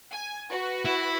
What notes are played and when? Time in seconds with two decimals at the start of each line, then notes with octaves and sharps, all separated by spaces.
0.12 G#5
0.50 F#4 B4
0.85 E4